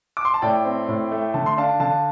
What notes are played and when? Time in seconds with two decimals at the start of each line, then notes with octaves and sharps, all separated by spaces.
0.17 D6
0.25 C6
0.34 A5
0.42 A2 D5 G5
0.65 C4
0.88 A2
1.11 A3
1.34 D3 A5
1.46 C6
1.57 D4 F5 A5
1.79 D3 F5 A5